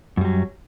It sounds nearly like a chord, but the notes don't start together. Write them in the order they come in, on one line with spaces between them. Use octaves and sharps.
F#2 G3 F#3